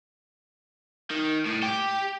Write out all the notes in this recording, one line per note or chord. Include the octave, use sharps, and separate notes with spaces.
D#3
A2
G4